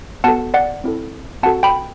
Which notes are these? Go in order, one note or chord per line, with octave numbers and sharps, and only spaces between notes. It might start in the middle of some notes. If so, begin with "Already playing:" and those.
B3 F#4 A4 F#5 A5
D5 F#5
C4 E4 A4
C4 F#4 A4 F#5 A5
G5 B5